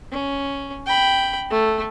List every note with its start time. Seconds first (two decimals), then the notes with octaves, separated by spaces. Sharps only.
0.11 C#4
0.86 G5 B5
1.50 A3